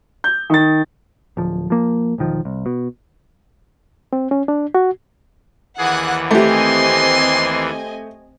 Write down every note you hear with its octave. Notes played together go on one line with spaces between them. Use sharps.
G6
D#3 A6
D1 F3
F3 A#3
E1 B1 D#3 F3
C2
B2
C4
C#4
D4
F#4
D#2 E3 G#4 F#5 F#6
A3 C4 G4 D#5 G#5 C6